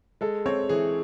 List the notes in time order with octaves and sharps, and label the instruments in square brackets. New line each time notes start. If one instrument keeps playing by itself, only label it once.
[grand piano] G#3 A4
C4 C#5
E3 G#4